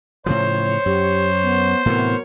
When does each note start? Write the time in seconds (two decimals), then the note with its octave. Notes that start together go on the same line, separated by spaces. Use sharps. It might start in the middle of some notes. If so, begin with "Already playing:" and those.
0.26 A2 C#3 F3 C5 C#5
0.86 F#2 G4
1.43 B3
1.86 A2 C3 E3 F#3 B3 A#4 C#5